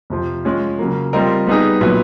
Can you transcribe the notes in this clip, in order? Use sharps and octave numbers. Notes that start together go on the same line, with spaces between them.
F2 C3 F3
G#3 C#4 F4
C#3 F#3 A#3
G3 C4 F4 A#4 D#5
G3 B3 D#4 G#4
A#2 F#3 B3 E4